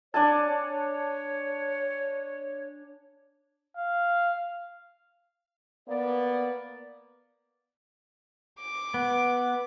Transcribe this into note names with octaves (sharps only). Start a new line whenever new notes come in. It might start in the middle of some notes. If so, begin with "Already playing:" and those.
D4 C#5 G#5 A5
F5
A#3 B3 D5
D6
B3